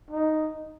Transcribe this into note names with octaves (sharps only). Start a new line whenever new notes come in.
D#4